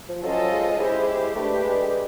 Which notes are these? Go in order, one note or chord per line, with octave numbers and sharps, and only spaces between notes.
F3
F#3 C#4 F4 A4 C5 D#5
G#3
G#3 E4 G4 C5
A3 D4 G4 B4
G#3